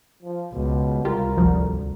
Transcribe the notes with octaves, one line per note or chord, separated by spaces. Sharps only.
F3
C#2 B2
C2 F4 G4 A#4
G#1 D2 F3